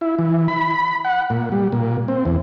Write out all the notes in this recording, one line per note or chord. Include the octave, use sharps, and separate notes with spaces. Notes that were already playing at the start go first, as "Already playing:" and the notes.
E4
E3
B5
F#5
A#2
G3
A#2
C4
E2